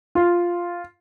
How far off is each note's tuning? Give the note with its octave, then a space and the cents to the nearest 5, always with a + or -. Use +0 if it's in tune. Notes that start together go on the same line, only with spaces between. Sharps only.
F4 +0